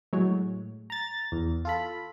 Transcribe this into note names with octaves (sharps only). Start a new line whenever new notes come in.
A2 F#3 G#3 C#5
A#5 A6
E2
F4 A4 B5